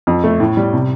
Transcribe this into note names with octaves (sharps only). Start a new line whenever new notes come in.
F2
A3
A2
G3
C3